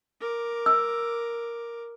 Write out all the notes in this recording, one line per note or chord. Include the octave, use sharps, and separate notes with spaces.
A#4 D6
E6